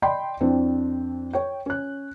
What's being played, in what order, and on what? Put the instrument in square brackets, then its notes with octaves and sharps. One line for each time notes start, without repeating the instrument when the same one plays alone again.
[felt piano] D5 D#5 G5 B5 C6
F2 C4 D4 E4
C#5 G5
C#4 F#6